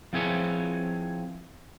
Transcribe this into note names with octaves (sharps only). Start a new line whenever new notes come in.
F3 C4 E4 G#4 B4 C#5